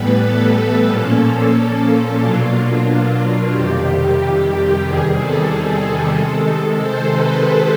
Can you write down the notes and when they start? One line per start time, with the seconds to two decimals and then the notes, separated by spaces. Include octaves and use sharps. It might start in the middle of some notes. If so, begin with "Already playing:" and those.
Already playing: A2 E3 G3 B3 B4
0.21 A4
0.87 A#2 F3 A#3 C#4
2.19 B2 F#3 A#3 D4 F4
3.51 F2 C3 D#3 G3 G4
4.83 E2 C3 D#3 G3 G#4
5.17 A4
6.16 C3 D#3 G#3
6.82 C5
7.14 B4